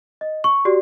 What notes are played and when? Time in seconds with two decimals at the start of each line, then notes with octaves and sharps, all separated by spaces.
0.21 D#5
0.44 C#6
0.65 F#4 G4 D5